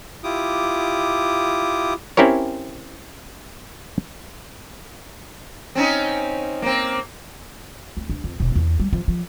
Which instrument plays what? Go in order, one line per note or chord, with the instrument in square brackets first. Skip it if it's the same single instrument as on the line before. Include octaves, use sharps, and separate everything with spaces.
[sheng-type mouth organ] E4 F4 G4 D6 D#6
[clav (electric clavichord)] C4 C#4 E4 G4 A#4 C#5
[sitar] C4 C#4 D#4
A#3 C4
[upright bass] D2
D4
F2
E1
E2
G3
F3
F3